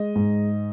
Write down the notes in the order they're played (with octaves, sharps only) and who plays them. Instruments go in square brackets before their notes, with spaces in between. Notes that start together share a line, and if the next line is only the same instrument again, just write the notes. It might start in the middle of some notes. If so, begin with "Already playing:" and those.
Already playing: [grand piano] G#3 D#5
G#2